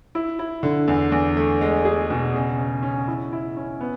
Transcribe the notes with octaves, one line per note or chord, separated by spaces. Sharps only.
E4
E4
D3
E2
E2
A3
G#3
G#4
B2
C#3
C#3
C#4
E4
E4
C#4
B3